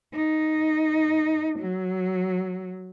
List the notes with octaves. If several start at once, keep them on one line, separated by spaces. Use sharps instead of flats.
D#4
F#3